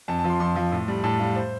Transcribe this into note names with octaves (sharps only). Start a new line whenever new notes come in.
F2 A5
A5
F3
C6
F2 C6
F3
A2
G3
A2 A5
G3 F5
C5